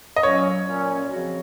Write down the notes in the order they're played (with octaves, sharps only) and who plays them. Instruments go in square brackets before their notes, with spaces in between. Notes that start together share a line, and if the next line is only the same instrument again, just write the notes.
[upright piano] D#5
[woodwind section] A#2 F#3 C#4 [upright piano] C#5
[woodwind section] A#2 F#3 C#4
C#3 F3 C4 F#4